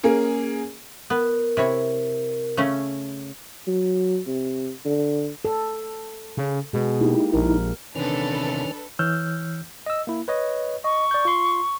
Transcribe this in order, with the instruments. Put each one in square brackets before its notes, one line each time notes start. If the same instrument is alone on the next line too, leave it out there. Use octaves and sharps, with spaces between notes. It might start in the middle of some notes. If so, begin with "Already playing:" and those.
[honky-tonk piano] A#3 C#4 G#4
[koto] B3 [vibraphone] A#4
[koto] C3 E4 C#5
C#3 A3 C#4
[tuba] F#3
C3
D3
[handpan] A4
[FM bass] C#3
[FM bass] B2 [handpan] G#3 G#4
[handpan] A#3 G4 [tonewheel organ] D#4 E4
[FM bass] A#1 [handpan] A#4
[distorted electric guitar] E2 C3 [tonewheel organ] D#3 C#4 F6 [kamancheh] D4 [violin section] A4 B4
[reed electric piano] E3 C#5 E6 F6 G6
[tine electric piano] D#5 E6
A#3 E4
B4 C#5 D#5
[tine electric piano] D#5 [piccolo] C#6
[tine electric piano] D5 G6
F4 C6